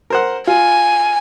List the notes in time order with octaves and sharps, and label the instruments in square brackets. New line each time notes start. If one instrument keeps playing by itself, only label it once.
[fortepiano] A#4 C5 F#5
[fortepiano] F4 [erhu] G#5